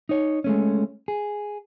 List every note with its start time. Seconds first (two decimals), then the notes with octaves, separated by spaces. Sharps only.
0.09 D#4 C#5
0.44 G#3 A3 C#4
1.08 G#4